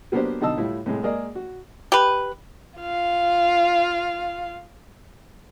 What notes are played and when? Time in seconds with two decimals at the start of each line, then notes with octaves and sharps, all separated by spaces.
0.12 F#3 A#3 B3 D4 G4 C5
0.41 B2 D3 D#4 D#5 A5 E6
0.58 A2 G3 E4 F4
0.86 A2 C3 G#3
1.03 G#3 A#3 G#4 A#4 D5 D#5
1.35 F#4
1.92 G4 B4
2.79 F4 F5